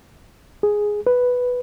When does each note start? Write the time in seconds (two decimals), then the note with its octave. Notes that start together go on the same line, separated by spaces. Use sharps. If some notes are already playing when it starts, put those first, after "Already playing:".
0.63 G#4
1.07 B4